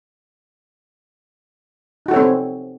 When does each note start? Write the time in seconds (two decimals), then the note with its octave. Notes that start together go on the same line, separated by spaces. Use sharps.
2.06 D#4
2.08 F#4
2.11 A4
2.14 C#5
2.16 C4